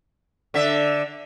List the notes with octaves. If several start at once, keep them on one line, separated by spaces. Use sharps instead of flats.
D3 E5